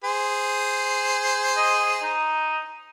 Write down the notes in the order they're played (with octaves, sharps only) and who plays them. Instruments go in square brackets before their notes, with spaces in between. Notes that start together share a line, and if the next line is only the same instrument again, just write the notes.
[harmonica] G#4 C5
[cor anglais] D#5
D#4